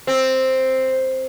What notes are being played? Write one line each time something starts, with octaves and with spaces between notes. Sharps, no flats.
C4